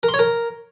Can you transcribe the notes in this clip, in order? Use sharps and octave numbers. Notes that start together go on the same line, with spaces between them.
A#4
C6
C#5
A#4